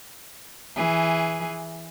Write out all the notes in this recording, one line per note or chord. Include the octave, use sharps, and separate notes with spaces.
E3 G#4